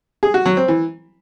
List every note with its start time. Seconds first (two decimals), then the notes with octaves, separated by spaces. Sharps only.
0.23 G#4
0.34 F#4
0.46 F#3
0.57 C4
0.68 E3